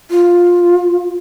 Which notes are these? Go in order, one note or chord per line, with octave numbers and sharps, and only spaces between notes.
F4